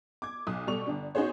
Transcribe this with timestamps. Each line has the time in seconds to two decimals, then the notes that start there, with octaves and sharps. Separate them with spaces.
0.22 D6 G#6
0.47 B1 D#6
0.67 B2 G3 A4 C#6 F7
0.87 G1 D4
1.15 B3 D#4 F#4 G#4 C5 C#5